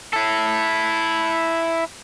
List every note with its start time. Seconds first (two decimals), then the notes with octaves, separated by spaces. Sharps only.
0.13 E4 A4